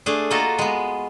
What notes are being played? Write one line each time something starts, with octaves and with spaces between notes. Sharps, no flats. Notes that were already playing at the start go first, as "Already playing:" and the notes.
A3 D4 G#4
A#3 F4 F#4 A4 D#5
G#3 B3